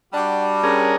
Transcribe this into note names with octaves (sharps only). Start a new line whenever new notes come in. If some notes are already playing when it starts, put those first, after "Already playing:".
G3 D4 F#4
C#4 G#4 A#4